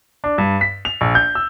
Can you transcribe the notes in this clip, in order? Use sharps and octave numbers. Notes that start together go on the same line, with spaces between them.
D4
G2
B6
F7
A#1
G6
E6